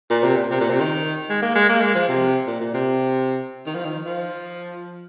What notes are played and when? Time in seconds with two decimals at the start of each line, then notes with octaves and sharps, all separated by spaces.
0.10 A#2
0.24 C3
0.36 A#2
0.51 C3
0.60 A#2
0.70 C3
0.80 D#3
1.29 G#3
1.42 A#3
1.55 G#3
1.69 A#3
1.81 G#3
1.95 F3
2.08 C3
2.47 A#2
2.60 A#2
2.74 C3
3.66 D#3
3.75 F3
3.85 D#3
4.05 F3